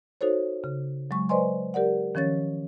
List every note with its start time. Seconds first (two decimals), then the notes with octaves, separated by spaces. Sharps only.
0.21 D#4 F#4 A4 C5 C#5
0.64 C#3
1.11 F#3 G#3 C#6
1.29 B4 C5 D5 D#5 G#5 C6
1.74 G4 A#4 D5 F#5
2.15 D#3 F3 C#4 C#5 A6